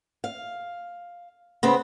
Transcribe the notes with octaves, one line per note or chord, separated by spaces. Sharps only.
F5
C#3 B3 C4